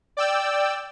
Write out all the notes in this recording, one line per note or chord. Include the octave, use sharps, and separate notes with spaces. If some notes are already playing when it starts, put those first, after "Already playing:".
D5 G5 E6